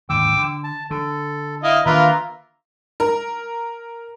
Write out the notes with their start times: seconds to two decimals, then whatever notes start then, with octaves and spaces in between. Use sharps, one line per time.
0.10 D#2 G#2 D3 G5 D6 E6
0.37 D3
0.64 A5
0.91 D3 A4
1.64 E4 D#5 F5
1.86 D#3 A#3 D4 F4 A#4 B4 E5 A#5
3.00 A#4